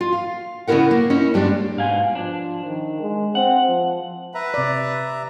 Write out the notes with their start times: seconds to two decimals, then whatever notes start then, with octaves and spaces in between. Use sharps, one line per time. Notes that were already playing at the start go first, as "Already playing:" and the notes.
0.01 F4
0.12 F5
0.67 C#3 A3 B3 E4 A#4 F#5
0.91 A#3
1.10 C#4 D#4 E4
1.34 G2 G3 G#3 D4
1.77 G#2 B2 F5 G#5
2.15 F3 D4
2.65 D#3
3.01 G#3
3.35 C4 F#5
3.68 F3
4.35 B4 E5 A#5
4.54 C3 D5